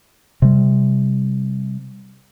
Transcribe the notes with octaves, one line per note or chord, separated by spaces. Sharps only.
C3 G3